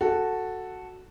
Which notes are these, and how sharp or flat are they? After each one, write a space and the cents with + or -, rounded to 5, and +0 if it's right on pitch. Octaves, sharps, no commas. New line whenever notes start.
F#4 +0 A4 +0